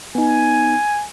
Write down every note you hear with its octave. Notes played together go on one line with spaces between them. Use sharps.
B3 D#4 G#5